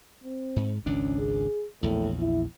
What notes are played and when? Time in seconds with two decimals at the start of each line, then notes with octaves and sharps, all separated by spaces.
0.24 C4
0.56 G#2
0.86 G#1 C#2 C#4 D4
1.19 G#4
1.83 A#1 E2 A2
2.20 E4